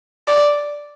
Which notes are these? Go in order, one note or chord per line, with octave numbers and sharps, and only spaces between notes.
D5